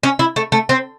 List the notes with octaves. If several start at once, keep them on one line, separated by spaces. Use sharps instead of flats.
C#4
E4
A3
A3
C4